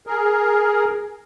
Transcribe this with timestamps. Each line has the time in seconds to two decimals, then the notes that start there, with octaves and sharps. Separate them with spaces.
0.07 G#4 A#4